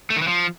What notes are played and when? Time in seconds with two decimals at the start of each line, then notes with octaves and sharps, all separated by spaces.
0.10 A3
0.16 D#3
0.22 E3
0.28 F3